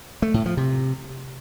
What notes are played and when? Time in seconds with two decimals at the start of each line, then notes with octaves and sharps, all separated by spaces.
0.22 A3
0.34 A2
0.46 F3
0.57 C3